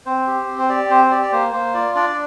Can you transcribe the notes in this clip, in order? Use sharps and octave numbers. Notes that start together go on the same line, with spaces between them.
C4 C5
G4
C4
C5
G4 D5
C4 C5
G4 D5
D5
A#3 C5
A#3 C5
F4 D5
D4 D5